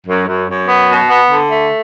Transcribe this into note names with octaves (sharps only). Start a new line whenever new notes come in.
F#2
F#2
F#2
B3
B2
B3
D3
A3